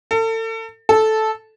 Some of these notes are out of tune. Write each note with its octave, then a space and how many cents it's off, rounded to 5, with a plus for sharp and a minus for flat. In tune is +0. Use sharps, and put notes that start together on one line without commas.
A4 +35
A4 -10